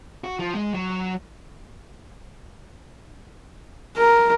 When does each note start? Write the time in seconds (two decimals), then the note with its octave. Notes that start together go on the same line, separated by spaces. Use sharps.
0.24 F#4
0.39 F3
0.55 G#3
0.74 F#3
3.97 A#4